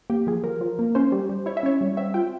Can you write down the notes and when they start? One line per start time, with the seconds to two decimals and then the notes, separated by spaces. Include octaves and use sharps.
0.10 A#3 G4
0.27 F3 G#4
0.44 F3 A#4
0.61 F3
0.79 A#3
0.95 C#4 C5
1.12 G3
1.29 G3
1.46 E4 C#5
1.57 E5
1.63 C#4 C#5
1.81 G3
1.97 C4 E5
2.14 F4 G5